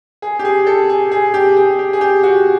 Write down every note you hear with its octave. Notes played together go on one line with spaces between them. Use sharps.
G#4
G4
G#4
A4
G#4
G#4
G4
G#4
G4
G#4
G4
F#4